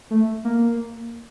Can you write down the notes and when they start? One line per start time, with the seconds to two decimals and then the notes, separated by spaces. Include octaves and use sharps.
0.11 A3
0.45 A#3